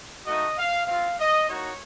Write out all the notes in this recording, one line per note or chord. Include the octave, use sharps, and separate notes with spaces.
A3 D#4 F#4 D#5
F5
C4 F4 F5
D#5
A#3 D#4 F#4 C#5